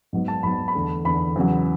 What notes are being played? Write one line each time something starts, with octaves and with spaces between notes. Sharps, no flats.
G#2 F#3 B3
A5
G#2 F#3 B3 B5
B5
E2 D3 A3
E2 D3 A3 B5
E2 C#3 F#3